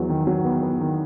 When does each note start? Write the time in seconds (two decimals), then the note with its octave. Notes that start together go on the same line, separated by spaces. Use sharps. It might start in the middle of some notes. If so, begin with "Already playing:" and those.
Already playing: E2 F#3
0.09 D#3
0.27 F#3
0.45 B3
0.63 B3
0.81 D#3